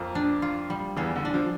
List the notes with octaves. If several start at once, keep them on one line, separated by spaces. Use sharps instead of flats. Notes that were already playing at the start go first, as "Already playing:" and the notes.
Already playing: F2 F3 A#3
D4
F4
G3
E2 E3 F4
D3
D4
F3